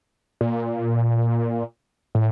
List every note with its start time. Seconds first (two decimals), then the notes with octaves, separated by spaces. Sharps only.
0.41 A#2
2.15 A2